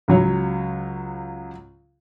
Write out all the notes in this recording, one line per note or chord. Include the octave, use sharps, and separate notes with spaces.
C#2 F#3 C#5